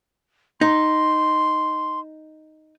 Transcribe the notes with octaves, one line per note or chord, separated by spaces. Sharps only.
D#4 C6